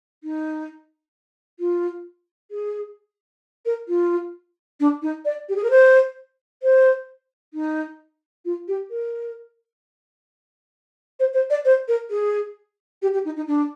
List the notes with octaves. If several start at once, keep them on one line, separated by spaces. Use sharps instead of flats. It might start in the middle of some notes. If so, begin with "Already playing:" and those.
D#4
F4
G#4
A#4
F4
D4
D#4
D5
G4
G#4
A#4
C5
C5
D#4
F4
G4
A#4
C5
C5
D5
C5
A#4
G#4
G4
G4
D#4
D#4
D4